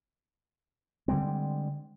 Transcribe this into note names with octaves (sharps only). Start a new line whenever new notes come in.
D3 G3 G#3 C4